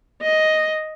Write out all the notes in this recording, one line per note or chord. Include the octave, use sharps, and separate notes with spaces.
D#5